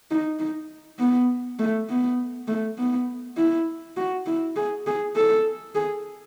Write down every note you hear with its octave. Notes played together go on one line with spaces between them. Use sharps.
D#4
D#4
B3
A3
B3
A3
B3
E4
F#4
E4
G#4
G#4
A4
G#4